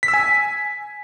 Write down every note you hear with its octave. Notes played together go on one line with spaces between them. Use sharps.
B6
E6
G#5